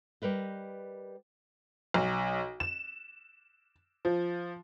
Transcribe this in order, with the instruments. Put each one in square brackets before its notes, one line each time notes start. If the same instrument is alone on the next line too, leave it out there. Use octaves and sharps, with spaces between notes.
[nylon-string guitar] G3 A#4 B4 D#5
[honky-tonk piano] B1
E7
F3